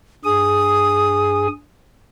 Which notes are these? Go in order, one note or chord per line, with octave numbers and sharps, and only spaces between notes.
G2 G#4 G#5 D#6